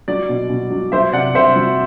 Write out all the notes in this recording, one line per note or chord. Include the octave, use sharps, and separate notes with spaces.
F#3 D5
B2
B2
F#3
F#3 C5 E5
C3 D5 F#5
C3 C5 E5
F#3